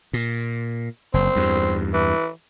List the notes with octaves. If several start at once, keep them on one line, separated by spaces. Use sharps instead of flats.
A#2
F#1 C4
E2 G2
E3